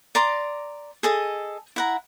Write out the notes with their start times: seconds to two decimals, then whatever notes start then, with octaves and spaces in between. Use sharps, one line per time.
0.15 D5 A#5 C6 D6
1.03 G#4 A4 D#5
1.76 E4 F#5 A#5